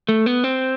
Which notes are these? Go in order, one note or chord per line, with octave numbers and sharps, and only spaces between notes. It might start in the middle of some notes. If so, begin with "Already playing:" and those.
A3
B3
C4